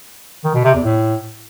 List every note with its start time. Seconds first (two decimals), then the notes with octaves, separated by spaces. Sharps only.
0.44 D#3
0.54 B2
0.64 C3
0.74 E2
0.84 A2